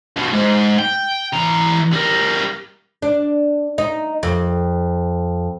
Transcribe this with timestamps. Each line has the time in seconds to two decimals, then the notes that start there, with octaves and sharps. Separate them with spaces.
0.17 G2 B2
0.33 G#2
0.79 G5
1.33 E3 A#5
1.93 G3 A#4
3.02 D4
3.78 D#4
4.23 F2